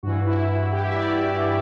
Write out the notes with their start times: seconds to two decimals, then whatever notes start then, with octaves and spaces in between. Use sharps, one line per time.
0.03 G2 E3 F#4
0.27 E4
0.72 G4
0.85 E5
0.96 D5